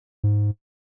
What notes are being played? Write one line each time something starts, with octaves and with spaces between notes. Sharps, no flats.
G#2